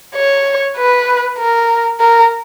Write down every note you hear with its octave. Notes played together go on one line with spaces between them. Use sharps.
C#5
B4
A#4
A#4